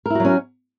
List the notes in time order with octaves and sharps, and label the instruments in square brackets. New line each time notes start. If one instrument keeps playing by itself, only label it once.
[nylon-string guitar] A#4
E4
F#4
F#3
C#4